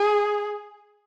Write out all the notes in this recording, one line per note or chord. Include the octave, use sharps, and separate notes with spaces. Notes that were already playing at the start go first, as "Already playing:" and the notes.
Already playing: G#4